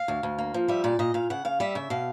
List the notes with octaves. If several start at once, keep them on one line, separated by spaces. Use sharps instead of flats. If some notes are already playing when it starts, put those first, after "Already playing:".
Already playing: F5
D2
D2
A#3
F3
G3 E5
A#2 D5
A#2 D#5
A#2 F5
C#3 F#5
C#3 F5
G3 E5
C#3 E5
B2 F5